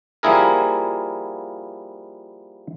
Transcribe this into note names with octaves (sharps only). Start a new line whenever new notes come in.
F3 G3 A#3 E4 G#4 A#4